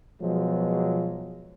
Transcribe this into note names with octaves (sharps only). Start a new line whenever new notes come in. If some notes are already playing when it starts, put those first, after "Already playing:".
B2 F3 F#3 G#3